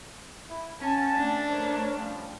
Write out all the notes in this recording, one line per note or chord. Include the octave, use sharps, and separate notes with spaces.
E4
C#4 F#5 G#5 A5
A3 D4
A#4 C5 C#5
F3 G3 C#4